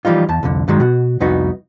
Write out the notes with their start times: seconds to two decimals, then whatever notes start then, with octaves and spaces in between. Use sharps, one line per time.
0.05 E3 F3 G3 D#4 F4
0.29 E2 A5
0.43 C2 F2 D3
0.68 G2 D#3 F#3 G#3
0.80 B2 F#4
1.20 C2 F2 B3 D#4 F#4